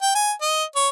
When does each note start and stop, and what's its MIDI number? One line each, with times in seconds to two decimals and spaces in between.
0.02 0.12 79
0.15 0.32 80
0.42 0.64 75
0.76 0.89 73